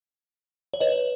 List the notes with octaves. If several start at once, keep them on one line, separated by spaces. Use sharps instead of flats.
C#5
B4 D#5